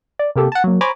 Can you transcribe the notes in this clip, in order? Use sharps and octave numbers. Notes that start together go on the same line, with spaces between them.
D5
C3 A#3 G4 A4
F#5 A5
F#3 A#3
C5 C#5 G#5 A#5 B5 D6